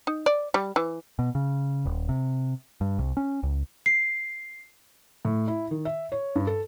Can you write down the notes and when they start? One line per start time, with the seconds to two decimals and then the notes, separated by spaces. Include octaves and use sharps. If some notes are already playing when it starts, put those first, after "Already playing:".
0.07 D#4
0.26 D5
0.54 G3
0.76 E3
1.19 B2
1.35 C#3
1.85 D#1
2.09 C3
2.81 G2
2.99 C2
3.17 C#4
3.43 C#2
3.86 C7
5.25 A2
5.48 E4
5.71 D#3
5.85 E5
6.12 C#5
6.36 G2
6.47 A4